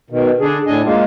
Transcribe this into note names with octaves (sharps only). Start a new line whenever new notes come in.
B2 D#3
D3 D4 G#4
A2 D4 D#5 G#5
G#3 A#3 F4